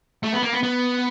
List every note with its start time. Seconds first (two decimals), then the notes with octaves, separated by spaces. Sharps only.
0.23 A3
0.33 B3
0.42 A#3
0.52 B3
0.63 B3